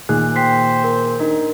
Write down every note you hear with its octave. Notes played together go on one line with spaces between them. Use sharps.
A#2 D#3 G#4 F#6
C5 G5 B6 C7
A#4
D4 D#4 A#4